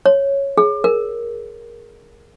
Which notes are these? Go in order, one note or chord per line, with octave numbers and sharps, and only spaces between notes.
C#5
G#4
A#4